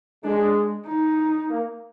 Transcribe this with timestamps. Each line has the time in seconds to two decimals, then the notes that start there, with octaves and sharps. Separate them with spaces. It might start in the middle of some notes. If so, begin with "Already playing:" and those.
0.24 G#3 D4
0.87 D#4
1.49 A#3